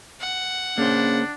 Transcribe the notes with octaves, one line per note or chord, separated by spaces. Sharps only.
F#5
C#3 A#3 D4 C5